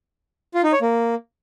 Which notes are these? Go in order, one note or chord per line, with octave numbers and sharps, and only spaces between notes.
F4
D#4
C#5
A#3